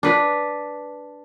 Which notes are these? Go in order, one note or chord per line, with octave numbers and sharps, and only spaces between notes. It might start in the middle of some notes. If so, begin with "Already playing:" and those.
D4 B4